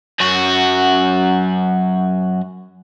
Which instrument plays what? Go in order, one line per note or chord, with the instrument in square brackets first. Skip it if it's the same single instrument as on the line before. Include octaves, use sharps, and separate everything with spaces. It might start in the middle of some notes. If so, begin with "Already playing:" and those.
[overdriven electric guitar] F#2 F#4